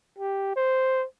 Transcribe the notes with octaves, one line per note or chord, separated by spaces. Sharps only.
G4
C5